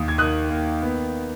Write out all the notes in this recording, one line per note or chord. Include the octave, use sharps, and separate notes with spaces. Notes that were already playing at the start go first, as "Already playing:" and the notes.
Already playing: D#2 D#4 D#6
G#6
D#3 D#6 F#6
A#3
B3